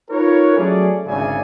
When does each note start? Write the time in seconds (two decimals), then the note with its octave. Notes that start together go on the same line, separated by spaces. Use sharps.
0.10 D#4 F4 A#4 B4 C#5
0.56 F#3 A3 C#4 G#4 D5
1.06 G#1 D2 C#3 D5 E5 G#5